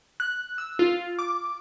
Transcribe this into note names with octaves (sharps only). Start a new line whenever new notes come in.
F#6
E6
F4
D6